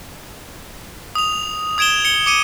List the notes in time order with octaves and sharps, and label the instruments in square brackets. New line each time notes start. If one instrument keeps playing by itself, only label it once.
[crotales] D#6 F7
D#6 G#6 D7 E7 G7
C#7 G7
D6 C#7 D#7